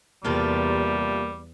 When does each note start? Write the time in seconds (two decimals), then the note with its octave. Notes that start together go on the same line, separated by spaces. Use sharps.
0.25 E2 C3 G3 A3 A#3 F4